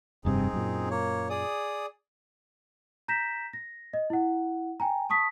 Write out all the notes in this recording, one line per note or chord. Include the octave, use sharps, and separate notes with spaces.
F1 G2 C3 C4 D#4 G#4
F#2 A#2
A#3 C#5
G#4 D5 D#6
A#5 G6 A#6 B6 E7
A#6
D#5
E4 F#5
G5 G#5 A#5
A5 C#6 D#6 B6